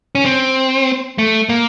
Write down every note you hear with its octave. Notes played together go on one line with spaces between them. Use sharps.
C#4
C4
A3
A#3